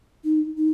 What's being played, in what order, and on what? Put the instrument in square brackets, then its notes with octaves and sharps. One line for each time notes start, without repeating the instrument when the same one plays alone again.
[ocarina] D#4
D#4